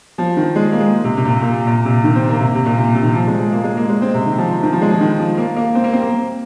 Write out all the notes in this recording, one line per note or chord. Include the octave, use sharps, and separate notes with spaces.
F3
D#3
G#3
A#3
G#3
C3
C3
A#2
A#2
A#2
C3
D#3
C4
A#3
C3
C3
A#2
C3
C3
D#3
F3
G#3
G#3
A#3
G#3
A#3
G#3
C4
C3
D#3
F3
D#3
F3
G#3
F3
D#3
F3
A#3
A#3
C4
A#3
C4
A#3